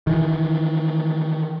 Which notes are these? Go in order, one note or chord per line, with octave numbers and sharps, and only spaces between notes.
D#3 E3